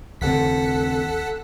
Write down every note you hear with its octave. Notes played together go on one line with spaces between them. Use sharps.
D#2 C#3 C4 A4 F#5 B6